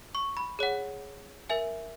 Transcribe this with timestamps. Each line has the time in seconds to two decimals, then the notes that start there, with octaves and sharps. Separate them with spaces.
0.15 C#6
0.37 B5
0.59 G#4 C#5 F#5
1.49 A#4 E5 G#5